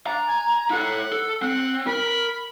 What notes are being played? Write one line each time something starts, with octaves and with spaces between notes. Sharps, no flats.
D4 A#5
G#5
E4 A4 F#5
A4
C4 F#5
A#4 B5